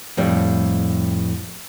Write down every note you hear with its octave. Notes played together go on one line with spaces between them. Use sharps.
F2 A2 G3